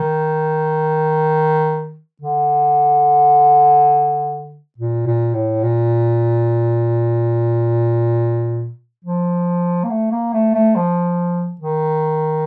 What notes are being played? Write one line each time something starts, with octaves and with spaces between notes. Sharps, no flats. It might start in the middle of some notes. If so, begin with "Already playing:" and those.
Already playing: D#3
D3
A#2
A#2
A2
A#2
F3
A#3
A3
A#3
A3
A3
F3
D#3